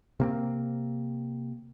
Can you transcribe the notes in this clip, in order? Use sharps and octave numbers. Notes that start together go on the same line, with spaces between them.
C3 A#3 C4